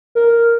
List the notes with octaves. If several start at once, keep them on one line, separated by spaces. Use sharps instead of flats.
A#4